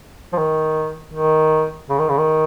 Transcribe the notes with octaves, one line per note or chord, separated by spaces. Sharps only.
F3
D#3
D#3
C#3
D#3
C#3
D#3